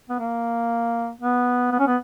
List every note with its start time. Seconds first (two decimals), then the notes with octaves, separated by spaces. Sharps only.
0.09 B3
0.19 A#3
1.22 B3
1.72 B3
1.79 C#4
1.87 B3